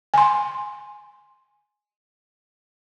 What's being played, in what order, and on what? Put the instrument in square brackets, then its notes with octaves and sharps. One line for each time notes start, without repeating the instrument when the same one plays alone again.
[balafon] G#5 C6